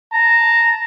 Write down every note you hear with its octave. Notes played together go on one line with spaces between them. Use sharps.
A5 A#5